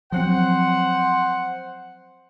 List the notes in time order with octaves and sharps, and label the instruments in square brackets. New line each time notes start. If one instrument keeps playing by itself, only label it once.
[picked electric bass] F3 F#3 C4 [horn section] C5 F#5